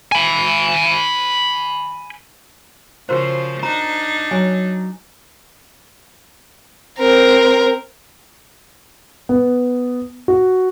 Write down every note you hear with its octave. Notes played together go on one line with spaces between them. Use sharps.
G#5 B5
C#3 F3 F#4 A#4 C5
D4 D#4 A#5
F#3 G#5
C4 A#4
B3
F#4